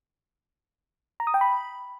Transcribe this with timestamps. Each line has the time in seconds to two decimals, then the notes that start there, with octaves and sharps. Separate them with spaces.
1.20 A#5
1.27 D#6
1.34 G5
1.41 B5